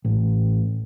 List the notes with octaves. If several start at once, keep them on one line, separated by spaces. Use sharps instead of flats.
A1